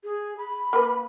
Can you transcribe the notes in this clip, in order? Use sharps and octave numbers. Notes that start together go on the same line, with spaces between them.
G#4
B5
A#3 B4